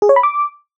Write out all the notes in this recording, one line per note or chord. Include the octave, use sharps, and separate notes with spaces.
G#4
C#5
B5
D6